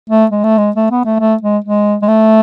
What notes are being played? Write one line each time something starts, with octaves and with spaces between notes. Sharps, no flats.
A3
G#3
A3
G#3
A3
B3
A3
A3
G#3
G#3
G#3
A3